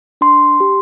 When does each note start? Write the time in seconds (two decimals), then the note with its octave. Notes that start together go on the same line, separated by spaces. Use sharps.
0.21 D4 C6
0.60 G4